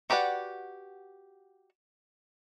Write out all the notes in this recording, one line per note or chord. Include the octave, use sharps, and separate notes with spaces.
F#4 G4 B4 D5 F#5